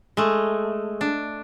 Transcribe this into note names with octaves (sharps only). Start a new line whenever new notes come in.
G#3 A3
D4